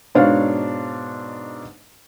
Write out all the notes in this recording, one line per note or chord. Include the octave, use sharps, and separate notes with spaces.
G#2 B2 D4 C#5 D5 F5